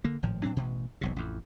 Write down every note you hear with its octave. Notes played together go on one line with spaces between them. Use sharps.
D3 A#3
G#1 A2 F3
A2 F#3 C4 D4
A1 B2
E1 B1 C3
A1 F2